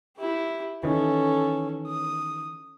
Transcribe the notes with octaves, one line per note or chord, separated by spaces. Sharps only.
E4 G4
D#3 E3 C#4 A4
D#6